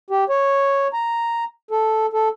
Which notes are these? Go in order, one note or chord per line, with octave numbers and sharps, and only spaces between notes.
G4
C#5
A#5
A4
A4